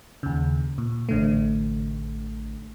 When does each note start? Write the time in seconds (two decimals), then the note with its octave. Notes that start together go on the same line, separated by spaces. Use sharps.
0.23 D#2 C#3
0.78 A#2
1.09 A1 D3 A3